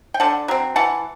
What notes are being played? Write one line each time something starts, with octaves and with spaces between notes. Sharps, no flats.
G5
D3 F#5 A5
F#3 C4
E3 F#5 A5